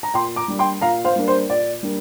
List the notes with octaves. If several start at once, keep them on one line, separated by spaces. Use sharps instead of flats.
A#5
A#2 G5 C6
A#5 D6
G3 A#3 D4
G5 C6
A#2 F5 A#5
C5 F5
G3 A#3 D4
C5
A#2 D5
G3 A#3 D4